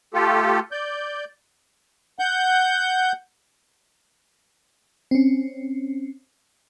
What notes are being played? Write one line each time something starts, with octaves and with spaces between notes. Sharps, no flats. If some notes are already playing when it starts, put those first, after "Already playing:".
A3 F4 G4 A4
D5 G6
F#5 G6
C4 C#4